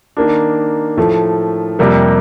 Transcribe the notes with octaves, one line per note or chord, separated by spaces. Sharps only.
D#3 A#3 D4
A2 F3 A3
F2 C3 G3 A#3